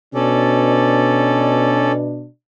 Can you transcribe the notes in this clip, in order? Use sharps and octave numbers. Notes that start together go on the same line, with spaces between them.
B2 C#4 D4 A4 D5